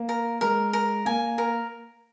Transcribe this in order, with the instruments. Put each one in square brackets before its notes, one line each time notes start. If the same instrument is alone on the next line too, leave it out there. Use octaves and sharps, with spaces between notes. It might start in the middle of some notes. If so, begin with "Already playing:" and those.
Already playing: [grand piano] A#3
[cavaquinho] A#4
[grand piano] G#3 [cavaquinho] A#4
[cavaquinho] A#4
[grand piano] A#3 [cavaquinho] G#5
[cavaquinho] A#4